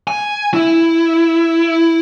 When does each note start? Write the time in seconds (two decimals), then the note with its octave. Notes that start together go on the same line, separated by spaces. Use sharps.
0.08 G#5
0.54 E4